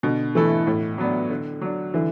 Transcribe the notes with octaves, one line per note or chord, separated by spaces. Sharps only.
B2 D3
E3 A3 E4 A4
A2
F#3 B3 D4
D3
F#3 D4
D3 E3